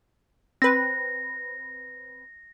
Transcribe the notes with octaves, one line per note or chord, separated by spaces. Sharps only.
C4 B4 A#6